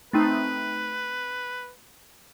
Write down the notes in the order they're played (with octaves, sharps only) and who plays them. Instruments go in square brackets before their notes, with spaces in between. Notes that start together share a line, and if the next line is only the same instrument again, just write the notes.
[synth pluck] A3 C4 D#4 [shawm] B4